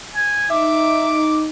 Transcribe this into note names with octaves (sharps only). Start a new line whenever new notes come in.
G#5
D#4 E5 D6